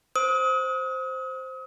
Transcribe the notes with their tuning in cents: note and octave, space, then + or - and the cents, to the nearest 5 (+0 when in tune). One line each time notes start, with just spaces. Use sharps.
C5 +0 D#6 +40